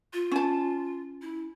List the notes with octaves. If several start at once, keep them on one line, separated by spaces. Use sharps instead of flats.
F4
C#4 A5
E4